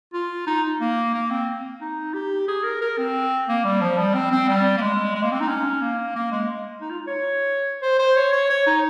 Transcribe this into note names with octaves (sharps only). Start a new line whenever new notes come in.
F4
D#4
A#3
A#3
C4
D#4
G4
G#4
A#4
A#4
C4
A#3
G3
F3
G3
C4
C4
G3
A#3
G#3
G#3
A#3
C4
D#4
C#4
A#3
A#3
G#3
D#4
F4
C#5
C5
C5
C#5
C#5
C#5
D#4